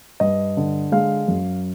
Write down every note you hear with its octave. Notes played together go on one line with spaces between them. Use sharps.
G2 D#5
D3
G#3 F5
F#2